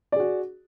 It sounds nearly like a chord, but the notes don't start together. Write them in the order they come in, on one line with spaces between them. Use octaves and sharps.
D5 G#4 F#4